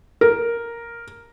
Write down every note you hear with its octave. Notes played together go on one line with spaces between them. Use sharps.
A#4